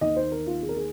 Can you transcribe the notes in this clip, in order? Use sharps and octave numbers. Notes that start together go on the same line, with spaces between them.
D#2 D#3 D#5
C5
A#4
F4
G#4
A#4
G#4